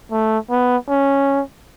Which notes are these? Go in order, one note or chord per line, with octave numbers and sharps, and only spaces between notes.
A3
B3
C#4